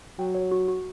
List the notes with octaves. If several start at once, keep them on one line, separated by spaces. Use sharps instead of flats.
F#3 G5
C#5
F#4
F#4